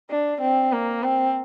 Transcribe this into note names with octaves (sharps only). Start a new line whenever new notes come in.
D4
C4
A#3
C4